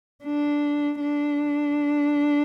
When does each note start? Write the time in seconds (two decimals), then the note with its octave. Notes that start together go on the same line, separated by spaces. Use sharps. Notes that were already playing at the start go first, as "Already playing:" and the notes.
0.24 D4
1.00 D4